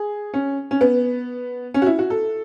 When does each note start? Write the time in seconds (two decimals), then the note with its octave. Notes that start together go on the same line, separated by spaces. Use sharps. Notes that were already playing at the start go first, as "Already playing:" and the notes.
Already playing: G#4
0.34 C#4
0.71 C#4
0.81 B3
1.74 C#4
1.82 F#4
1.86 E4
1.99 F#4
2.10 A4